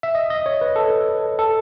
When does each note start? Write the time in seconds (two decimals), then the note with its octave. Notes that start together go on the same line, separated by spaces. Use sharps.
0.03 E5
0.15 D#5
0.30 D#5
0.46 C#5
0.61 B4
0.76 A4
1.39 A4